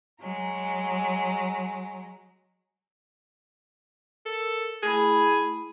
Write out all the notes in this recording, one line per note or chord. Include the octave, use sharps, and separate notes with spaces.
F#3 G#3 A#5
A4 A#4
A3 E4 G#4 B5